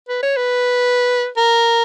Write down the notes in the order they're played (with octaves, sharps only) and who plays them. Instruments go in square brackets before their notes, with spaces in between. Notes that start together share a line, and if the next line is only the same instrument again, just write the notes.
[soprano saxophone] B4
C#5
B4
A#4